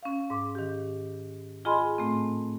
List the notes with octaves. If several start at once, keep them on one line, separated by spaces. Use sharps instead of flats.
C#4 F5
G#2 D6
D#3 G4
F4 G#4 D#5 G#5 B5 C6
A2 A3 C4